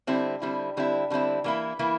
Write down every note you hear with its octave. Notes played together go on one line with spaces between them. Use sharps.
D3 G3 C4 E4
D3 G3 C4 E4
D3 G3 C4 E4
D3 G3 C4 E4
E3 A#3 E4
E3 A#3 E4